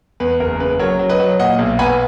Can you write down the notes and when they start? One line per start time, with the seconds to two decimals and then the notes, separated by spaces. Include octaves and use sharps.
0.20 E2 B4
0.40 F#1 A#4
0.60 C#3 B4
0.79 F#3 A#4 C#5
0.99 F#3
1.09 B4 D#5
1.20 F#3
1.39 A#2 D#5 F#5
1.59 B1
1.79 B3 G#5 B5